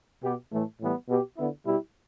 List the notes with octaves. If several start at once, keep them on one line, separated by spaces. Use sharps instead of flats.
B2 B3 G4
A2 E3 A3
A2 E3 G3 B3
B2 B3 G4
D3 B3 E4
B2 G3 E4 G4